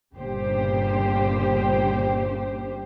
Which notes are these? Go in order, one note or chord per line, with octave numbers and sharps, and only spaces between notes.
G1 A#2 C#3 G4 C5